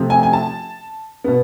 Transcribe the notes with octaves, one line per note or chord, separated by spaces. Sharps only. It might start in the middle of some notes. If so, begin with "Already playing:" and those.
Already playing: C3 F3 A3 C4
G#5
G#5
A5
B2 B3